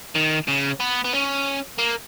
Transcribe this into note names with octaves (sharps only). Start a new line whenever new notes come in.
D#3
C#3
B3
B3
C#4
A#3